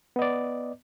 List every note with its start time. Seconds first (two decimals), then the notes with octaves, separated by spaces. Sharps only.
0.16 B3
0.19 D#5
0.22 D5